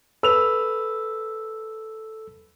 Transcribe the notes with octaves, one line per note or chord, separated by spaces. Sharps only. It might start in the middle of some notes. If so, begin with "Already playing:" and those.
A4 B4 E6 F7